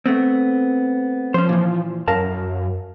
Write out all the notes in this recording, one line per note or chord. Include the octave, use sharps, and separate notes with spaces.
A3 B3 C4
F3 C#4 C5
A#2 E3
F#2 A#4 F5 A5